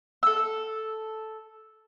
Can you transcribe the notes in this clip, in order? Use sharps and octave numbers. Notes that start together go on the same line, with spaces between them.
A4 E6